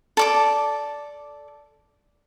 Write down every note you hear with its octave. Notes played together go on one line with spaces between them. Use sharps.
A4 D5 D6